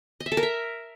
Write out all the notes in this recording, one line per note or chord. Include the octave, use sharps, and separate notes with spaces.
D#5
E5
A4
A#4
E5